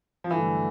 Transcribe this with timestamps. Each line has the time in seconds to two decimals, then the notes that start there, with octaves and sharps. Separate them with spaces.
0.24 F3
0.31 G2 D3 E3 F#3 A3